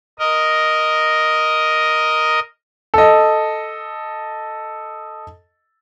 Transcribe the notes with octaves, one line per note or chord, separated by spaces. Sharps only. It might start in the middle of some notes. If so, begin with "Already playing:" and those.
A#4 D#5
A4 D#5